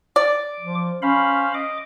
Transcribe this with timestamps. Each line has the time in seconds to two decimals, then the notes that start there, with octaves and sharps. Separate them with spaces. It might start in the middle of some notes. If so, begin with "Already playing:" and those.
0.16 D5 D6
0.60 F3
1.02 C#4 C5 F5 B5
1.54 D#5 D6